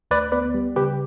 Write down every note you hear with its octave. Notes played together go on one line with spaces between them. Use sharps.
D2 B4 D5
B3 B4 D5
G3
C#3 G4 B4